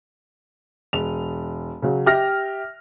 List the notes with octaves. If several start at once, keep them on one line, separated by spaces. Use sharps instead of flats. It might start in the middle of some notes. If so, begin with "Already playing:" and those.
E1 F7
C#3 F#3
G4 E5 F6 A#6